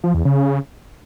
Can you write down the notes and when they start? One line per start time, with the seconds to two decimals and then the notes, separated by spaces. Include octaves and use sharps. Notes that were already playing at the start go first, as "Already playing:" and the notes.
0.04 F3
0.14 E2
0.25 C#3